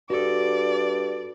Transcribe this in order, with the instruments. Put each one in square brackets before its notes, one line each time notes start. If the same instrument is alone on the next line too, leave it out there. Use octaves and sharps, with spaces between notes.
[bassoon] G2 [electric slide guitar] F#4 A4 [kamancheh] D5